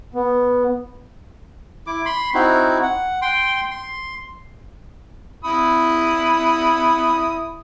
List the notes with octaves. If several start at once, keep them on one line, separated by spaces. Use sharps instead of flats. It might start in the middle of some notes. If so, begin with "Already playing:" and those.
B3
E4 D6
B5 C6
C4 D#4 E4 F#4
F#5
G5 C6
C6
E4 B5 D#6